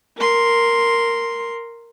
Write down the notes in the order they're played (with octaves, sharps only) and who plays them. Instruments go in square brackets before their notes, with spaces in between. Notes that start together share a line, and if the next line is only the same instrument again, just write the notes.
[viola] A#4 C6